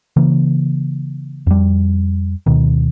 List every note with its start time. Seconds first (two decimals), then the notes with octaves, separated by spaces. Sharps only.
0.16 C#3 E3 A#3
1.47 F2 G3
2.46 D2 B2 D#3